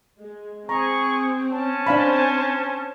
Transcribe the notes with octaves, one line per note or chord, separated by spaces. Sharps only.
G#3
C4 G#4 A#5 C#6
C#4 A5
C4 D4 C5 F5 G#5 B5